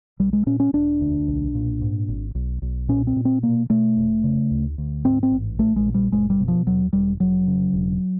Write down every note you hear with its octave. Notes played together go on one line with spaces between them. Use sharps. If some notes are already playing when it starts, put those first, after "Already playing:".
B1 G3
G#3
A#2 C#4
C#4
E1 D4
D2
B1
A#2
G#2
G#1
B1
B1
A#2 C#4
C4
A#2
C4
B2 A#3
B2 A3
F1
C#3
D2
D2
G#2 C4
C4
A1
A#1 A3
G#3
A#2
G3
F#1 G#3
G3
B2
F3
D#2 F#3
E1 G3
F1 F#3
C#3
E1